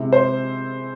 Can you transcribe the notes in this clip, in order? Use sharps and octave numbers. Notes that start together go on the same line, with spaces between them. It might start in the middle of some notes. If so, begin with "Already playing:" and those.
Already playing: C3 G#3 C4 E4
C5